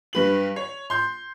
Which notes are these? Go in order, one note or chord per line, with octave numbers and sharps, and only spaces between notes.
G2 B4 F#7
C#5
C6 G6